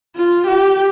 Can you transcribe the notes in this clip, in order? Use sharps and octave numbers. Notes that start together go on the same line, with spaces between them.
F4
G4